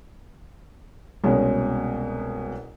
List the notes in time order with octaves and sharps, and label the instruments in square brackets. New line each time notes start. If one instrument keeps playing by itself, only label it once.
[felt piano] C2 B2 G#3 C#4